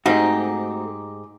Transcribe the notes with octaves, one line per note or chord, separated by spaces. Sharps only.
G#2 A3 C4 D#4 F#4 G4